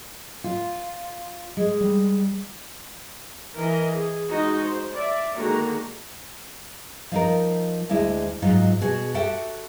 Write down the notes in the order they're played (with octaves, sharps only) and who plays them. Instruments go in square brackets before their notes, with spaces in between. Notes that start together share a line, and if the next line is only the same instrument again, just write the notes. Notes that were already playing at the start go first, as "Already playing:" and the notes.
[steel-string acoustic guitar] F4
G#3
[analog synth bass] G3
[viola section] E3 A#4 D#5
G#4
G#3 D#4 F#4 D#5
C5
D5 E5
D3 D#3 G#3 A#3 F#4 A#5
[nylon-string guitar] F3 D#4 A#4
D2 G#3 E4
G#2 F#3 D#4 F4
B2 F#4 G#4
F#4 G4 A4 E5 F#5 G5